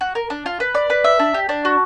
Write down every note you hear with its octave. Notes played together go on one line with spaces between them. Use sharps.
F#4
A#4
D4
F4
B4
D5
B4
E5
D4
G4
D4
F#4